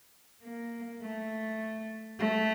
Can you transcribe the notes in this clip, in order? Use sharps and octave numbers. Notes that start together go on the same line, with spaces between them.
A#3
A3
A3